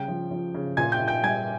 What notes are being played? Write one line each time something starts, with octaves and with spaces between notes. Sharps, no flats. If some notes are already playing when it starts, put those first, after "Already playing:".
Already playing: C#3 G3 G5
F3
F3
C#3
A#2 G#5 G#6
G5 G6
A#2
G5 G6
G3 G#5 G#6